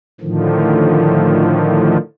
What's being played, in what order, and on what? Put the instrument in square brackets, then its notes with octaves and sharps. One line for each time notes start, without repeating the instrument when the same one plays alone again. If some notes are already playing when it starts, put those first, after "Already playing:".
[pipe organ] A2 D3 D#3 F3